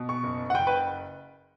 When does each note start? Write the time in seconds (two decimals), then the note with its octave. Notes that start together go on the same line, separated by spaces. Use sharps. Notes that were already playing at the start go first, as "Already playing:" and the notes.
Already playing: B2
0.09 C#6
0.23 F#1
0.50 F#5
0.54 F#1 G5
0.67 B4